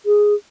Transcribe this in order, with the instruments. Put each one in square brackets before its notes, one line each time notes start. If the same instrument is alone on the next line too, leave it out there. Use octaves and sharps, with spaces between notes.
[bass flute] G#4